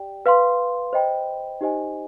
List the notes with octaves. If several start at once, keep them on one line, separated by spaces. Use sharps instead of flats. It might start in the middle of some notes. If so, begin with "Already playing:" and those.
Already playing: G4 D5 G5
B4 F5 C6
C5 D#5 G5 B5
D#4 G4 C5 D#5 G#5